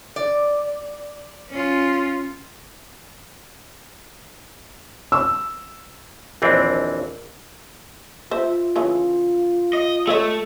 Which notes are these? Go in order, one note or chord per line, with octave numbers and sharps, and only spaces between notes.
D5
C#4 F4
E6
A#1 D#2 E3 C4 D4
F4 C5 E5
C#3 E3 C#4
D#5
A3 A4 C#5 D#5